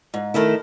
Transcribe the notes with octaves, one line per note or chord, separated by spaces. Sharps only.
G#2
D#3 A3 E4